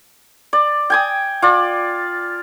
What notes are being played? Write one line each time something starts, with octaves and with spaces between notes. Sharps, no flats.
D5
G5 G#5 D#6
F4 D5